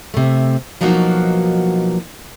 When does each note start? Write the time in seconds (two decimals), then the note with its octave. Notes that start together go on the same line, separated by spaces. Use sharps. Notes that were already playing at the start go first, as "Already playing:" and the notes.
0.14 C3 A3
0.81 B2 F3 F#3 A#3 D#4 F#4